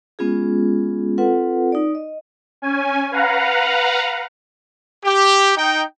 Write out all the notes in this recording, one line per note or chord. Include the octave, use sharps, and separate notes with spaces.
G#3 B3 C#4 F4 G#4
C4 F4 A4 B4 F#5
D#4 D5
D#5
C#4 G#5
B4 F5 F#5 A#5
G4
D#4 G5